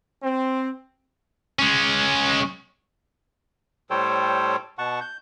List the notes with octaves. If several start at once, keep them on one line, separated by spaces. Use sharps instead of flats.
C4
G#3 C#4
A2 G3 A4 C5 C#5 G5
B2 F#5 A5 C#6
G6